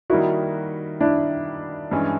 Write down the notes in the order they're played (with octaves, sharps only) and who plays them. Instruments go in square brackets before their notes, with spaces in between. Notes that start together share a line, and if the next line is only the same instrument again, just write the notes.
[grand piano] D#3 G3 A#3 D#4 [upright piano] E4 F#4
[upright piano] D4 E4
[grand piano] G2 E3 G#3 C#4